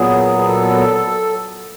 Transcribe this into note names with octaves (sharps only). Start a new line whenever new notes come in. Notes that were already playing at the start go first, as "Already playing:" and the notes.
Already playing: A#2 F#3 B3 G#4
G#4
A4